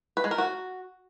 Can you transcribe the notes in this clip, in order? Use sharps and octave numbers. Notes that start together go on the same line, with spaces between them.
B4
G#3
A#4
F#4